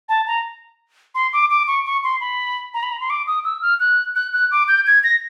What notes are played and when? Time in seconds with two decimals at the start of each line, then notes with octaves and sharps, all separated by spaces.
0.09 A5
0.27 A#5
1.15 C6
1.33 D6
1.51 D6
1.68 C#6
1.86 C#6
2.04 C6
2.21 B5
2.74 A#5
2.83 B5
2.92 A#5
3.00 C6
3.10 D6
3.27 D#6
3.45 E6
3.62 F6
3.80 F#6
4.15 F#6
4.33 F#6
4.51 D6
4.68 G6
4.87 G#6
5.04 A#6